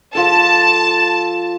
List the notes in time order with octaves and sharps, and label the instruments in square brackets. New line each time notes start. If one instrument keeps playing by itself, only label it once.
[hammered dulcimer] F3 A4 [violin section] A5